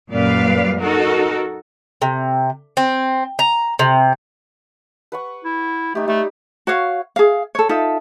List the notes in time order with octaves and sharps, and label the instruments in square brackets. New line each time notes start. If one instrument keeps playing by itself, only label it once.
[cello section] F#2 A#2 G3 B4 D5 F5
D#4 F#4 A4 A#4
[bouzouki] C3
C4
A#5
C3
[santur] B4 F#5 C#6
[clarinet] E4
[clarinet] A3 [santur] D#4 G4
[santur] G3 [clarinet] A3
[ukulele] F#4 C#5 F5
G#4 F5
A4 C#5
D#4 F4 A4 E5